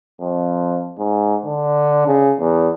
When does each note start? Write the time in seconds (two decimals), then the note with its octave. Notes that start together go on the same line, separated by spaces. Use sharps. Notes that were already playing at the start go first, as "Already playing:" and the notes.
0.21 F2
0.98 G#2
1.45 D3
2.07 C#3
2.40 E2